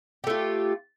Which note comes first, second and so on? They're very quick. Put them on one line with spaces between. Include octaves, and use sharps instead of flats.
G4 A3 F4